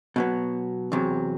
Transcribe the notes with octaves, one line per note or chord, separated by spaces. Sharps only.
B2 F#3 B3
E2 C3 F#3